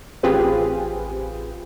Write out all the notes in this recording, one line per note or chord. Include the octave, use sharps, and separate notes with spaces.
A1 C4 F4 G4 G#4 B4